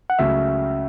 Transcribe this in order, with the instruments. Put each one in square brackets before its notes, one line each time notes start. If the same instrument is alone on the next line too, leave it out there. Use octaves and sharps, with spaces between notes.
[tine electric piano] F#5
[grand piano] C#2 C#3 F#3 A3 C#4 [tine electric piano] E5